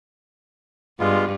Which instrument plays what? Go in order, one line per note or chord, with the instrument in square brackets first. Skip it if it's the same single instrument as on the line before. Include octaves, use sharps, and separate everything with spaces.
[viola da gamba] G2 [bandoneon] G#3 B3 F4